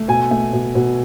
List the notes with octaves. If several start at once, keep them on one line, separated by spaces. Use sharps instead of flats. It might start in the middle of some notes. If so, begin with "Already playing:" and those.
Already playing: A3
B2 G#5
A3
B2
B2